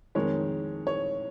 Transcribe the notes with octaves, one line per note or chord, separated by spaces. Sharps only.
F2 D#3 G#3 C#5
C#5